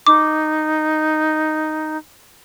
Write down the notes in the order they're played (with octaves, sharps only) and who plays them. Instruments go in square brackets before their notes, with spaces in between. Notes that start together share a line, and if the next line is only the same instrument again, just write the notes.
[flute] D#4 [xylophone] D6